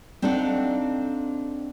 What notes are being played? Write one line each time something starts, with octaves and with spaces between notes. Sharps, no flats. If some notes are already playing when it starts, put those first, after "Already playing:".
C4 D4 D#4 A4 F5 F#5